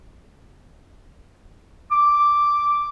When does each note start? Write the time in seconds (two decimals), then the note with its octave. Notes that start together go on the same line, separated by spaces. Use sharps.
1.92 D6